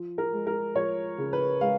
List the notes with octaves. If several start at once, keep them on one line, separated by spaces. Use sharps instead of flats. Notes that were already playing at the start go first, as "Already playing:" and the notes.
Already playing: F3
A#4
G#3
A#4
F3 C#5
C#3
B4
G#3 F5